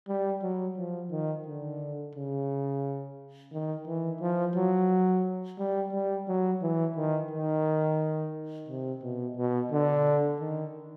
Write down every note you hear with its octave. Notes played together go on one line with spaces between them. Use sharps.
G3
F#3
F3
D#3
D3
C#3
D#3
E3
F3
F#3
G3
G3
F#3
E3
D#3
D#3
C3
B2
B2
D3
D#3